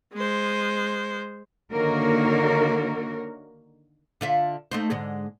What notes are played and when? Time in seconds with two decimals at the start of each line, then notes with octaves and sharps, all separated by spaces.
0.14 G#3 C5
1.72 D3 D#3 A#3 F#4 A#4 C#5
4.21 D3 F4 E5
4.71 A3 D#4 C5
4.90 G#2 D3 G#3